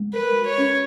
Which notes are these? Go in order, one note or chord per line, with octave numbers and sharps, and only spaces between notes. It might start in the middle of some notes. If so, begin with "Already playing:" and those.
Already playing: G#3
A#4 B4
F#4
C#5
C#4